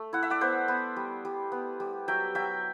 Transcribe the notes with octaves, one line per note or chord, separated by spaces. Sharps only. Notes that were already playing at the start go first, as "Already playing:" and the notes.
Already playing: A3 A5
E4 F#5
E5
D5 F#5
B3 C5 E5
B3
G3
G3
B3
G3
F#3 E5 G5
F#3 E5 G5